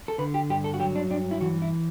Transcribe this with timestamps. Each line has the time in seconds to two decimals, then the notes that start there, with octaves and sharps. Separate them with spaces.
0.08 A4
0.18 D3 B4
0.34 G4
0.50 G2 G4
0.64 A4
0.74 F#4
0.80 F#3 G4
0.96 D4
1.10 G2 D4
1.31 E4
1.41 E3 F#4
1.62 E4